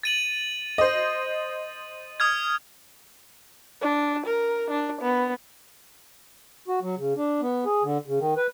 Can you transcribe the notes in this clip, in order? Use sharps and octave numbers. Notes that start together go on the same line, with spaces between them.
A6 D#7 F#7
C5 D#5
D#6 F6 G#6
D4
A#4
D4
B3
F#4
F#3
C#3
D4
B3
G#4
D3
C#3
D#3
B4